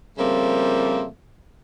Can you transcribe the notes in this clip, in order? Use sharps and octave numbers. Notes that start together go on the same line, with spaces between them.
C#3 F3 G3 A3 A#3 C4